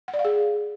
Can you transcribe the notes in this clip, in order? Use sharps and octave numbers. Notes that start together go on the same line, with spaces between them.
F#5
D5
F5
G#4